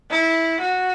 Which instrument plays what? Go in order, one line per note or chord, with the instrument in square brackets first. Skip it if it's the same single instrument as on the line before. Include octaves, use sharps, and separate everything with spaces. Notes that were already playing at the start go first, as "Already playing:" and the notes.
[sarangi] E4
F#4